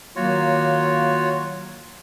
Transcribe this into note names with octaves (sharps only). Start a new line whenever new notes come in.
D#3 F#3 A#3 F4 F#4 C#5